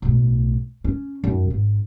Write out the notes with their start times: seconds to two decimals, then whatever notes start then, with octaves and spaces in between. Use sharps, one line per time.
0.02 B1 A2
0.84 C#4
1.24 F#2 D#4
1.50 G#1